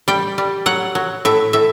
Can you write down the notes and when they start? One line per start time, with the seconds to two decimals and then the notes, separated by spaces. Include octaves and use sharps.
0.08 G3 G5
0.38 G3
0.66 F#3 F#5
0.95 F#3
1.25 A2 E5
1.53 A2 E5